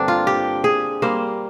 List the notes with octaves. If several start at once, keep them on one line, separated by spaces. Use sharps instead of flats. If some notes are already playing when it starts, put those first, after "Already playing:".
Already playing: G2 D3 A#3 C4 D4
F4
G4
G#4
G3 A#3 C5